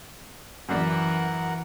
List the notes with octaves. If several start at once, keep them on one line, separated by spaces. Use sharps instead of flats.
F#2 E3 A#4 D5 F#5